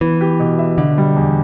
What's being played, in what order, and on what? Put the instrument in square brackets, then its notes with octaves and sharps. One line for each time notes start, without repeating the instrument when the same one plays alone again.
[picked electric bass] E3 [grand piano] B3
[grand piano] G4
B2
E5
[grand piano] B2 [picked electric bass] D3
[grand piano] G3
E2